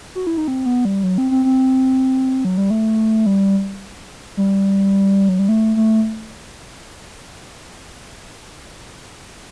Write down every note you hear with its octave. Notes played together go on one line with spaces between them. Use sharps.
F#4
E4
D#4
C4
B3
G3
F#3
C4
C4
C4
F#3
G3
A3
G3
G3
F#3
G3
A3
A3